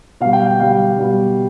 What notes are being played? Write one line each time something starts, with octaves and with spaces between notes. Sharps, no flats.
B2 G3 F5
G5
G5
B2 G3 F5
B2 G3